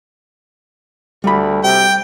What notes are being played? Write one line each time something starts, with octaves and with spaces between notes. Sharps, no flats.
D2 G3 B5
C3 G5